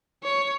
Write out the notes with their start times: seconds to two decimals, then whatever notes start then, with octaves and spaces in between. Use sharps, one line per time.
0.23 C#5